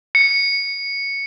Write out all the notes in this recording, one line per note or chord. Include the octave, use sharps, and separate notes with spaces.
C#7